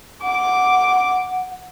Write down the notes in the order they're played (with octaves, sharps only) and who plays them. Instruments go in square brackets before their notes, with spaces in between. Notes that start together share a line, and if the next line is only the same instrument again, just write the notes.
[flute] F#5 [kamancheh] D6